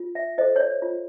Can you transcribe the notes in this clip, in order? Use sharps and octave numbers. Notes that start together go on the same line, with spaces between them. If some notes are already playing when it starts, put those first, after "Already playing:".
Already playing: F4
E5
A4 C5 D#5
C#5
D5
F4